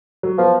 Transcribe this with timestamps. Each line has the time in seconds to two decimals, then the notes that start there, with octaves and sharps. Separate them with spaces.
0.23 F#3
0.38 F3 B3